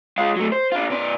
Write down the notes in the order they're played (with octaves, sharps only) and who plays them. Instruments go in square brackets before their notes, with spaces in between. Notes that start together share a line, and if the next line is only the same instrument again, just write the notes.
[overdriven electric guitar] G#3 F4
F#3 A3
C5
D4 F4
B2 D5